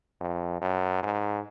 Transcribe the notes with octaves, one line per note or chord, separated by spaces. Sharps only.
F2
F#2
G#2